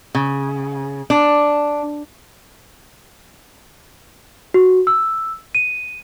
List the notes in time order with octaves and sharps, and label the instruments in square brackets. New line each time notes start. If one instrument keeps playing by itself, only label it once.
[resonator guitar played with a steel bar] C#3
D4
[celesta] F#4
E6
D#7